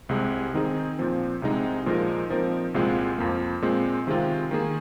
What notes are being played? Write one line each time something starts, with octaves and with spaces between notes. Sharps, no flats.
C2 C3 G#3
D#3 C4 D#4 G#4
A#2 F3 C4
C2 C3 G#3 C4 D#4
A#2 F3 G#3 D#4 A#4
A#2 F3 C4 D#4 A#4
C2 A#2 G#3 C4 F4
F2 F3 A#3
A#2 G#3 C4
C3 D#3 G#3 C4 F4
D#3 A#3 G#4